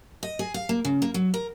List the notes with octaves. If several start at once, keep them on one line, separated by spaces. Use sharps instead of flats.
D#5
G#4
F5
A#3
C#3
A#3
F#3
A#4